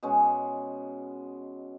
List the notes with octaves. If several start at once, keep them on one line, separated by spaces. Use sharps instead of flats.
B2 G#3 C#4